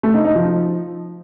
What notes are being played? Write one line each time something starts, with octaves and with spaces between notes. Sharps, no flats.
A3
D#4
D#4
F3